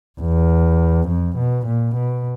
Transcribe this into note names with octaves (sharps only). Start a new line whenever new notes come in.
E2
F2
B2
A#2
B2